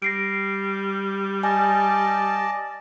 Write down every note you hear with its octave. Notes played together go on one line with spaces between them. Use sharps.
G3 A#6 C7 D7
D5 D#5 G#5 A5